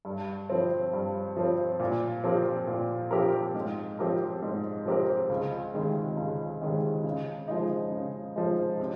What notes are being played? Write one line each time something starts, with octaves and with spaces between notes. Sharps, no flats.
G2
F3 C4
G2
F3 C4
A#2
F3 C4 G4 A#4
A#2
F3 C4 G4 A#4
G#2
F3 C4 G4 A#4
G#2
F3 C4 G4 A#4
C#2
C3 D#3 G#3
C#2
C3 D#3 G#3
C#3
F3 G#3 D#4
C#3
F3 G#3 D#4
C3